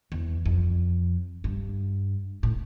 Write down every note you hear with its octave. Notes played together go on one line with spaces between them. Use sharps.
E2
F2
G2
A2